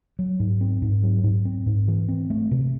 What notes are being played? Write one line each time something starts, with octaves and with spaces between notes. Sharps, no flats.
F#3
G#2
C4
G#2
F#3
G#2
C4
G#2
E3
C4
A3
C3